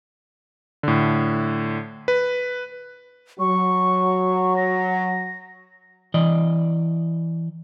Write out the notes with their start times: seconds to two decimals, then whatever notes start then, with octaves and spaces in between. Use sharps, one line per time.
0.83 A2 D3
2.08 B4
3.40 F#3 C#6
4.57 A#6
6.14 E3 D5 D#5